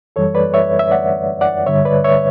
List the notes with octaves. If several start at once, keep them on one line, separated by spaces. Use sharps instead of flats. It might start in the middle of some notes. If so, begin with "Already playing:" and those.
F#2 E3 G3 A4 C#5
B4 D5
C#5 E5
E5
D5 F#5
D5 F#5
G2 D3 G3 C#5 E5
B4 D5
C#5 E5